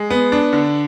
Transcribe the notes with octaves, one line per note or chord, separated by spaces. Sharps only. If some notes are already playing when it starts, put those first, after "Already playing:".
Already playing: G#3
B3
D4
D3